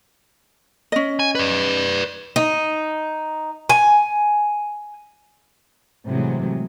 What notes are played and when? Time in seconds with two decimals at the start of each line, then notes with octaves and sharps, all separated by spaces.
0.92 C#4 D#5
1.19 G#5
1.35 B4 D5
2.36 D#4
3.69 G#5
6.06 A2 C3 E3 F#3 G#3